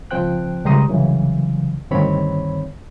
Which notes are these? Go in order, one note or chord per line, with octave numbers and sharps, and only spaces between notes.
C#2 F3 C4 C5 G5 F#6
C#2 G3 G4 A#5 C6 D#6
C2 C#3 E3 F#3
D2 G2 D#3 C4 C#5 B5